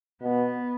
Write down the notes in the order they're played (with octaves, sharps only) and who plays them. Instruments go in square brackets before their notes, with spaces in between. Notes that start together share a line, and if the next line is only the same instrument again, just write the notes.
[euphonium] B2 [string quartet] B3